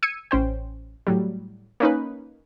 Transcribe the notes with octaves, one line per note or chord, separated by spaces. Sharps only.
E6 G#6 C#7 D#7
A1 C#4 C5 G5
A2 F#3 G3
A#3 C#4 D#4 B4